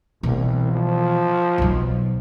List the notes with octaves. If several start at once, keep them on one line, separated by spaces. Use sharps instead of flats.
C2 B2 E3
F3
B1 F#3